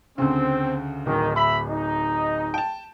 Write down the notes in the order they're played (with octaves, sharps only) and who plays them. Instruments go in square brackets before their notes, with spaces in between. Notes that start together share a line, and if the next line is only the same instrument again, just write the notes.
[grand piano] D2 C#3 [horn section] C4
[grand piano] D1 [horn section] D#3
[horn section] E5 B5
D#4
[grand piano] G5 A5